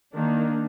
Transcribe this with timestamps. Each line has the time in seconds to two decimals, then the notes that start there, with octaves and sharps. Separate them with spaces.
0.13 D#3 A#3 D4